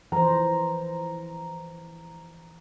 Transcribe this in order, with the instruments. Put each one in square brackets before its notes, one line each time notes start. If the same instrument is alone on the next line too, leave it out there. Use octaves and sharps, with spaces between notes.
[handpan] E3 F3 C5 [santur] A#5